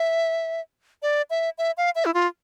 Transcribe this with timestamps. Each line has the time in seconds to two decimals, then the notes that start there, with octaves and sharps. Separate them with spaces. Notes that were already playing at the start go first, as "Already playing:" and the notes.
Already playing: E5
1.02 D5
1.30 E5
1.58 E5
1.77 F5
1.95 E5
2.05 E4
2.14 F4